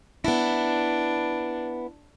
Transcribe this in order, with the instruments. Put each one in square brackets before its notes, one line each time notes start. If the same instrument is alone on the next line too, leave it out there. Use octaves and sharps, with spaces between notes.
[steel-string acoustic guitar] B3 E4 [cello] D4